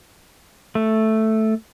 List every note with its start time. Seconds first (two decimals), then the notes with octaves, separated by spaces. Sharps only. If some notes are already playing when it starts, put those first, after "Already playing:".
0.75 A3